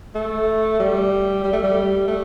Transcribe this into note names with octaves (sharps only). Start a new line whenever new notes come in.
A3
G3
G3
A3
G3
A3